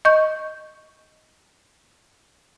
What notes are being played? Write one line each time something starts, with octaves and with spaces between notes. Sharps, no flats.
D#5 C#6 G6